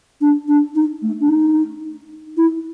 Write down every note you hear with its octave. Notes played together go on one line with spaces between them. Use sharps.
D4
D4
D#4
A3
D4
D#4
E4